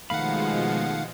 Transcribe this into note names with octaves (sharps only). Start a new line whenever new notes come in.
B2 D#3 F3 G#3 A3 F5 F#5 B5